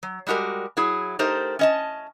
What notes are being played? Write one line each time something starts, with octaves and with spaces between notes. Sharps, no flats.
F#3
G3 G#3 F#4 G4 A#4
F#3 E4 G#4
A3 D#4 G4 A#4 C5
C#4 D#5 A5